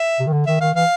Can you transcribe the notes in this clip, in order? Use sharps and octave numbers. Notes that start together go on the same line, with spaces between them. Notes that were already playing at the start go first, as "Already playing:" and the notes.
Already playing: E5
C3
D#3
D3
D#3 E5
D#3 F5
E3 F5